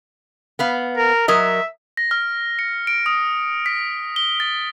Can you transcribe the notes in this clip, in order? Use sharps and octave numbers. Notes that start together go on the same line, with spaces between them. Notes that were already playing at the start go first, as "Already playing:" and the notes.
B3 B4 F5
A#4
F#3 A#4 D#5 E5
A#6
F6
C#7
D7
D#6
B6
G7
A6